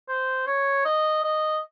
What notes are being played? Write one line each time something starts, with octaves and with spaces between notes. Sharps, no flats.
C5
C#5
D#5
D#5